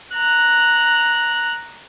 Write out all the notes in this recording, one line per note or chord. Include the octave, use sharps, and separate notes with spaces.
A#5 F#6